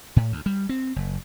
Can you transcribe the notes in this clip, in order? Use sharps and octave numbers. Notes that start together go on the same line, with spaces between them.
A2
D2
G3
C4
F#1